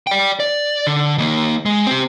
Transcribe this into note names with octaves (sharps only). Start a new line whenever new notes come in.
D5 G5
D5
D3
D#3 A#3
G#3
C4 G4